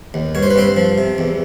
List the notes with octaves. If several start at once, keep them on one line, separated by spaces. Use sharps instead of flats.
D#2
G2 C#5
C5
B4
G2 C4 C5
F3
C3
E2